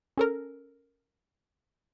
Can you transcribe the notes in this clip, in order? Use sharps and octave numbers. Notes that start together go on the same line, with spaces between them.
C#4 A4 A#4